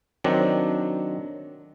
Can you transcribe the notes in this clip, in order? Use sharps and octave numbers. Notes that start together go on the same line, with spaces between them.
D#3 F#3 C4 D4